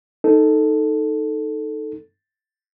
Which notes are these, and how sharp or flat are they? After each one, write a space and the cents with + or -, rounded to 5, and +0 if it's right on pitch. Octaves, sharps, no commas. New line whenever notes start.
D#4 +0 A4 +0